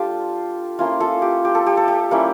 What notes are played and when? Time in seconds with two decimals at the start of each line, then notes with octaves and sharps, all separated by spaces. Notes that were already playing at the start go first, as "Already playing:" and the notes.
Already playing: G3 D4 F4 G4 A4
0.79 A#3 C#4 E4 F4
1.00 F4 A4
1.22 G4
1.45 G4
1.55 A4
1.66 G4
1.77 A4
1.88 G4
2.11 G3 A#3 C#4 E4